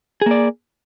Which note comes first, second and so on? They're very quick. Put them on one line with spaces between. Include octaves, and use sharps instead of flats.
G#4 A#3 D5